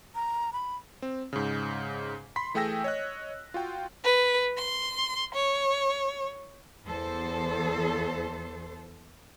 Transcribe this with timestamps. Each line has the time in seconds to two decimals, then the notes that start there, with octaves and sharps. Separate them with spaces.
0.15 A#5
0.53 B5
1.02 C4
1.33 G#2 C#3
2.36 B5 C6 B6
2.54 E3 A3 G#4 G5 E6 A#6
2.84 C#5 D#5 F#6
3.54 F4 F#4 G5
4.04 B4
4.58 C6
5.35 C#5
6.87 E2 A4 C5